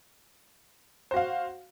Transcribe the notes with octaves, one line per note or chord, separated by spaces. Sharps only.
F#4 C5 F5